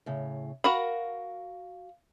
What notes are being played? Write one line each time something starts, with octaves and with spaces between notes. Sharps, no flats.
A2 C#3
F#4 A#4 F5 B5